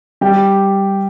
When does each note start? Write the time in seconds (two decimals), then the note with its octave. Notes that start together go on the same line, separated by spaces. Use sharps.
0.21 G3 G4